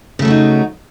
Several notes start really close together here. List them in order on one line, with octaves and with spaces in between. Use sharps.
C#3 A3 F#3 F#4 D#4